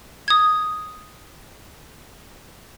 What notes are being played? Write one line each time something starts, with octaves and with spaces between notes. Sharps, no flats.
D#6 G#6